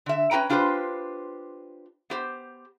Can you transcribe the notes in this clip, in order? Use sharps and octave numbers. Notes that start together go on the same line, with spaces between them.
D3 E5
C#4 G4 B4 G5 A#5
D4 F4 G4 G#4 B4 C5
B3 G4 C5